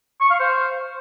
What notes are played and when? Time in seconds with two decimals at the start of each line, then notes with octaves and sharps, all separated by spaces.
0.21 C#6
0.30 F5
0.40 C5